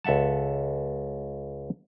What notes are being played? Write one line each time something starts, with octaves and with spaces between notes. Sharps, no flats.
C#2 A4 E5 F#5 A5